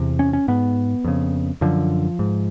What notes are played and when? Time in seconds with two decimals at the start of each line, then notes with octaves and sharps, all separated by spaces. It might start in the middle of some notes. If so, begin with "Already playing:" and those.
Already playing: E2 C3
0.19 C#4
0.33 C#4
0.48 G#2 B3
1.05 F2 C#3
1.61 F#2 D3 F3
2.19 G#2